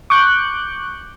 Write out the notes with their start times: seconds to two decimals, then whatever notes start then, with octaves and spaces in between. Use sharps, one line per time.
0.10 C#6 D6 F#6 G6